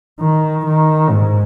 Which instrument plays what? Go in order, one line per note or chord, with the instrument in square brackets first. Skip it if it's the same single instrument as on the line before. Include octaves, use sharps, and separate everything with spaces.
[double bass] D#3
D#3
G#2